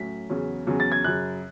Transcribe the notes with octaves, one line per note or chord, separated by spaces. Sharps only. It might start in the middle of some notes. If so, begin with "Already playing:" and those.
Already playing: A2 F#3 C#4 B6
E2 C#3 F#3 C#4
E2 C#3 F#3 C#4
A6
G#6
F#2 C#3 F#3 F#6